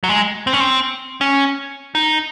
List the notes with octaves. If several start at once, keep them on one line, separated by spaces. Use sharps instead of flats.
F#3
G#3
C4
C#4
C4
C#4
D#4